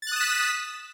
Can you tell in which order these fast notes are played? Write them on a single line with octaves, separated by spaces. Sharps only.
A6 F#6 D#6 E7 B6